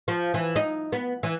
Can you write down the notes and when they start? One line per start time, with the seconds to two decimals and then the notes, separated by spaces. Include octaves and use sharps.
0.08 F3
0.34 E3
0.56 D#4
0.92 B3
1.23 E3